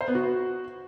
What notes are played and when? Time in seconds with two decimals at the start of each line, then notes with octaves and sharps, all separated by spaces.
0.01 C5
0.08 B3
0.15 F#4